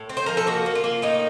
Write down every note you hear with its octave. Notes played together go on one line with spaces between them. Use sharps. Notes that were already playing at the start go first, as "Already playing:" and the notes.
Already playing: A2
C4
C5
F3 A#4
A4
A#3 F#4
A#3
F4
A#3
A2 D#4